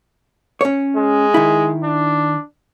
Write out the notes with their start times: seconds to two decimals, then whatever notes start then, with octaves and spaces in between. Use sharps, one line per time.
0.61 C#4 C#5
0.96 G#3
1.34 D#3 E4
1.83 D4